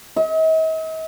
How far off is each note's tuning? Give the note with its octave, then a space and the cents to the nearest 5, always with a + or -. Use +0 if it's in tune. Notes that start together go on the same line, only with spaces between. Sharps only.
D#5 +45